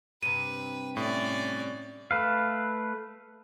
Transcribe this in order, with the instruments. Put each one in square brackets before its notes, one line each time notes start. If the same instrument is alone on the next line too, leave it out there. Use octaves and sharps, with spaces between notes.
[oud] G2 C3 [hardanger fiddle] B4 [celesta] D#7
[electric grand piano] A2 [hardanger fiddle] C#4 D5
[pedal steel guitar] A3 B4 F5